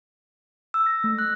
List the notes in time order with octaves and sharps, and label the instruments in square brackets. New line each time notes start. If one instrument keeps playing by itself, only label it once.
[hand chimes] E6
A#6
A3
F#6